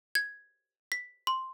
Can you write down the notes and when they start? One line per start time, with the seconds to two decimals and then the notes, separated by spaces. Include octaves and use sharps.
0.15 G#6
0.92 B6
1.27 C6